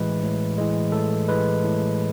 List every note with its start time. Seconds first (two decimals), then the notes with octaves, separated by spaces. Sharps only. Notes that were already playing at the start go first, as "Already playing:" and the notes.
Already playing: A2 E3 G#3 B4
0.22 A2
0.58 E3 G#3
0.92 A2 A4
1.28 E3 G#3 B4
1.64 A2